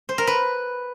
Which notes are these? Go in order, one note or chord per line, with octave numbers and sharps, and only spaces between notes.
C5
A#4
B4